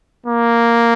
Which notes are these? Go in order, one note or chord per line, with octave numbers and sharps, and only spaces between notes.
A#3